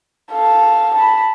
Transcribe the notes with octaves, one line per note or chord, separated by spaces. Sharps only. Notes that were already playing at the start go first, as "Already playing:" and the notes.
A4 F5
A5 B5